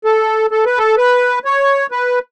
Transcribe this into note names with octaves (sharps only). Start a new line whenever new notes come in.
A4
A4
B4
A4
B4
C#5
B4